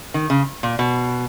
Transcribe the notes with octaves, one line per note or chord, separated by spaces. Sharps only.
D#3
C#3
A#2
B2